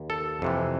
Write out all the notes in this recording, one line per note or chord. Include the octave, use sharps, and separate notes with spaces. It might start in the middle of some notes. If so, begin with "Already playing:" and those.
Already playing: D#2
A4
F2 C3 E3